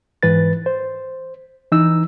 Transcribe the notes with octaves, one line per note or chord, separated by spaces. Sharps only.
G#2 E3 B4 A6
C5
E3 D#4 E6